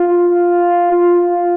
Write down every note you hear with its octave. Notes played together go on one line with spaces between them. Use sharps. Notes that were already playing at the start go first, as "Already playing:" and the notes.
Already playing: F4
F4